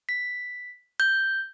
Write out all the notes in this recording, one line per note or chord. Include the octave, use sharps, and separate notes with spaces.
B6
G6